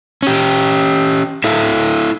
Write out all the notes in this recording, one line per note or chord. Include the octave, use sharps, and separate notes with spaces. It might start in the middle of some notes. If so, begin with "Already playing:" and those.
C#4 G4
E4 A4 E5 F5